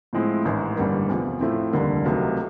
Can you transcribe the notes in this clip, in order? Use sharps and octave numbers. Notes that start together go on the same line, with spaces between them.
A2 F3 G#3 C4 E4
A1 G#2 D#3 G#3
A1 G2 D3 G3 A#3
E2 C3 F3
A2 F3 A3 C4 E4
F1 D#2 D3 G3 A#3
C#2 C3 D#3 F#3 A3